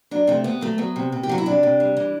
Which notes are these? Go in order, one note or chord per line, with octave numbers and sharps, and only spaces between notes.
F#3 D4
C3 A3
C3 B3
F#3 A3
F#3 B3
C3
C3
G4
F#3 F#4
E4
C3 D4
C3
G3
E3